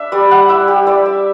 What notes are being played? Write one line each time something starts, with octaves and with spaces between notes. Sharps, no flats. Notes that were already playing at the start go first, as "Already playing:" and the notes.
Already playing: D4 E5
G3 D5
F#5
E4 E5
G4
E4 D5
E5